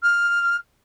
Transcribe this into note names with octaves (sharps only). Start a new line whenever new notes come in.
F6